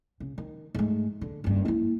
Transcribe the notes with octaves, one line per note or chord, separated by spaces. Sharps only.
C#3
D#3
G#2 A3
D3
F#1 G2
A#3 E4